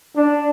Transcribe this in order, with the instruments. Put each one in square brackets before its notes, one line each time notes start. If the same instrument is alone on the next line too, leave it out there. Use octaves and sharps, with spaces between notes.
[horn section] D4